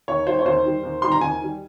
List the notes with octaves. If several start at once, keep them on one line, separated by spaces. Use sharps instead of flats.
D#2 C#5
D#3 G3 C5
C#5
D#2 C5
D#3 G3
D#2
D#3 G3 C6
A#5
D#2 G#5
D#3 G3